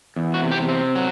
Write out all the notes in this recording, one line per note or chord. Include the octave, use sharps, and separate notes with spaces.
E2
F#4
C3
G4
C4
F#3